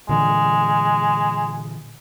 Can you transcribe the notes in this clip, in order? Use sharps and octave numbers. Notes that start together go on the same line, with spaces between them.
A#2 D3 E3 G#3